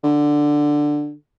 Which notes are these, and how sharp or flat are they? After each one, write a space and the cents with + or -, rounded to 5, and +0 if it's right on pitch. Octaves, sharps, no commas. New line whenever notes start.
D3 +5